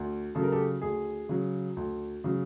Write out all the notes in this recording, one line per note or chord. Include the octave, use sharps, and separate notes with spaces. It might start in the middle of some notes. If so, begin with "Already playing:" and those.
Already playing: D2
C#3 F#3 A4
A#4
G4 A4
D2 G#4
C#3 F#3
D2
C#3 F#3